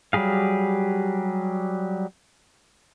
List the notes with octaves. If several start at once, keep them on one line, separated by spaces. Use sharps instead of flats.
F#3 G3 G4 G#4 F5